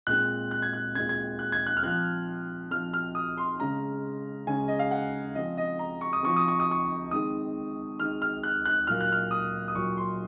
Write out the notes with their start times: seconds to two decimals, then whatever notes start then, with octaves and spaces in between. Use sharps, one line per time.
0.07 A#2 G#3 C4 F#6
0.51 F#6
0.62 G#6
0.73 F#6
0.95 A#2 G#3 C4 G#6
1.09 G#6
1.39 F#6
1.52 G#6
1.67 F#6
1.77 F6
1.83 F3 C4 F#6
2.71 F3 C4 F6
2.93 F6
3.15 D#6
3.38 C6
3.59 C#3 G#3 C#4 A#5
4.47 C#3 G#3 C#4 G#5
4.68 D#5
4.79 F5
4.91 F#5
5.35 F3 C4 D#5
5.57 D#5
5.79 A#5
6.01 C#6
6.13 D#6
6.23 F3 C4 C#6
6.36 D#6
6.48 C#6
6.60 D#6
6.71 C#6
7.11 D#3 G#3 C4 D#6
7.99 D#3 G#3 C4 F6
8.22 F6
8.43 F#6
8.65 F#6
8.87 A#2 F#3 A#3 F6
9.01 F#6
9.12 F6
9.31 D#6
9.68 D#6
9.75 A#2 F#3 A#3 C#6
9.97 C6